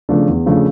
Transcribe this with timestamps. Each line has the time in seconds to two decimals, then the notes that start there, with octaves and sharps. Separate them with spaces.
0.09 C#3 F3 A3 D4
0.27 E2
0.46 C#3 F3 A3 D4